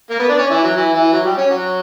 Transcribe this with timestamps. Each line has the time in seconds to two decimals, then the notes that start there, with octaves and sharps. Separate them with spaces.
0.10 A#3 A#4
0.19 B3 B4
0.29 D4 D5
0.38 C#4 C#5
0.50 E3 E4
0.63 F#3
0.75 E3 E4
0.94 E3 E4
1.13 F#3 F#4
1.25 G3 G4
1.37 C#4 C#5
1.50 F#3 F#4